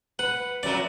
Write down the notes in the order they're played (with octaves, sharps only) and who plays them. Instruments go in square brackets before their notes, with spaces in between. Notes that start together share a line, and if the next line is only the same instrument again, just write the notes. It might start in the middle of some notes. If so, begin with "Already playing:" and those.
[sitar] B4 [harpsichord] F#5
[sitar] F2 F#3 [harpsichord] D5